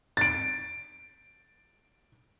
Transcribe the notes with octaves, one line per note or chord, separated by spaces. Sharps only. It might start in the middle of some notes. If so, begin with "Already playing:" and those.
A6 D7